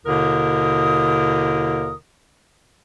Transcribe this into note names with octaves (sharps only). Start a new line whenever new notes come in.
D#2 B2 D3 E4 A#4 D#6